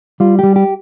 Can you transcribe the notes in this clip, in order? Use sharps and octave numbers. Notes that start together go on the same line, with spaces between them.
G3 F4
G3 G4
G4